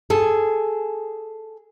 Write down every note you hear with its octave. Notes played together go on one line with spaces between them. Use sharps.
G#4 A4